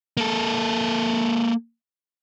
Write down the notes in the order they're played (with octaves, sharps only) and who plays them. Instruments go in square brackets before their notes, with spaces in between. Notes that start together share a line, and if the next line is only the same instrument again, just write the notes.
[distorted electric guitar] A#3 A4